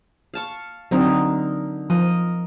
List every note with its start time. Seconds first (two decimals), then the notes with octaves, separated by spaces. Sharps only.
0.34 F5 A5 C#6
0.91 D3 F#3 C4 D#4 A#4
1.90 F3 A#4 D#5